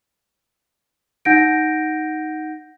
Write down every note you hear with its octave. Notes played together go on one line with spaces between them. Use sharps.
D#4 F#5 G6 A#6 D7